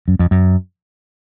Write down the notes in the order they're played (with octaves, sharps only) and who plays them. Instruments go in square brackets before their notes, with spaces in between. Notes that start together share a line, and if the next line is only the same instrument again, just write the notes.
[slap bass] F#2
F2
F#2